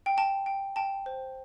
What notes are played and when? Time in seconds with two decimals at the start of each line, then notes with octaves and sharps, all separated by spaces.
0.06 G5
0.17 G5 A5
0.46 G5
0.76 G5 A5
1.06 C5